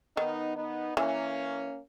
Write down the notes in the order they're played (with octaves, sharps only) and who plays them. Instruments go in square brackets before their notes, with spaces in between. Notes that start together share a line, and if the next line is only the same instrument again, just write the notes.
[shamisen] D#3 [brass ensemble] B3 D#4
[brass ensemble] B3 D#4
[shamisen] E3 [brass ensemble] A#3 C#4